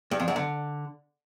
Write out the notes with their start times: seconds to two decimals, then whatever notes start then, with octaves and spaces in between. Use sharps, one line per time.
0.11 G2
0.20 F2
0.28 F#2
0.36 D3